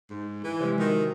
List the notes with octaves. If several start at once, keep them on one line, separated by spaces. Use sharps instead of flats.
G#2
E3
C3 F3 G#3
D#3 F#4 D#5